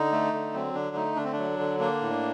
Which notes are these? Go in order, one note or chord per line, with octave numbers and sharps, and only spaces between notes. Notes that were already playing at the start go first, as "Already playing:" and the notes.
Already playing: D3 D#4
A3
D3
F#3 C4
D3 D4
A3 D#4
D3 D4
C4
F#3 D4
D3
A#3 D4
A2